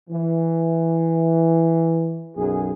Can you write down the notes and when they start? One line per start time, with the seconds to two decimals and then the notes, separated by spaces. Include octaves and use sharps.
0.10 E3
2.37 B1 F#2 G#4